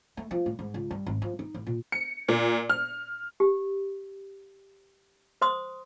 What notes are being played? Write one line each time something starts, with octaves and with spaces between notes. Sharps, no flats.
A3
F3
A2
G#2
C#2
G2
G#1
F3
D#4
A1
A#2
C#7
A#2
F6
G4
C5 C6 D#6